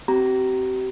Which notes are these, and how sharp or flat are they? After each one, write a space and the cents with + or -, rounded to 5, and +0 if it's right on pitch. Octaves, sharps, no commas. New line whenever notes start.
C4 +0 G4 -40 A#5 +0